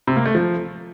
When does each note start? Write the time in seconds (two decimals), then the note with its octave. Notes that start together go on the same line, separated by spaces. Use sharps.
0.07 C3
0.16 A#3
0.26 A3
0.35 F3